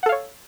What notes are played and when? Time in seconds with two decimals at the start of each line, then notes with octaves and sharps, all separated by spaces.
0.03 F#5
0.06 A4
0.09 F5
0.12 C#5